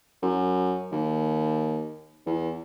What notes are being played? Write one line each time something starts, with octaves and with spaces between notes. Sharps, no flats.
F#2
D#2
E2